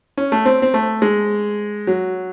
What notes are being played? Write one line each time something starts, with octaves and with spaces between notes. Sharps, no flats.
C#4
A3
C4
C4
A3
G#3
F#3